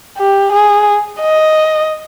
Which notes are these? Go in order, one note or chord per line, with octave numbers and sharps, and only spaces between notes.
G4
G#4
D#5